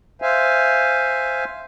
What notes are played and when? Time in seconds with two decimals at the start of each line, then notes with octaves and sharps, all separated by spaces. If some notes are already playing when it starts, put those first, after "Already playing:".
0.22 C5 E5 F5 G#5